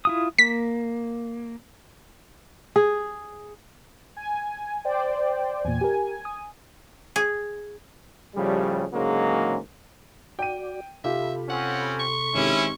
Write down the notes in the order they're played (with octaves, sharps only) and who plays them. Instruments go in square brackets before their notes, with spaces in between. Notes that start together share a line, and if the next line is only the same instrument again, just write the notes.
[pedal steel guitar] E4 F4 D#6
[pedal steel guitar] A#3 [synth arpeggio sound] B6
[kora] G#4
[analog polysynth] G#5
C5 D5 G5
[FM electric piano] E2 A#2 [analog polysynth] G#5
[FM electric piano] G4 A#4
D#6
[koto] G#4
[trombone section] A2 C#3 F3 G3
D2 G#2 C#3 F#3 G#3 A#3
[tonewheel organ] F#4 D5 [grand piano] G5 D#7
[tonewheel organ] C3 A4 B5 [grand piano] F4 G4 F5 [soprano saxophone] E5
[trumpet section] C4 C#4 [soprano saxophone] F#5
[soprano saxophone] C#6
[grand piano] G#1 G#2 G4 [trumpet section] C#4 E4